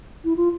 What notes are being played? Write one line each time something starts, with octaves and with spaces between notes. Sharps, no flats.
E4
F4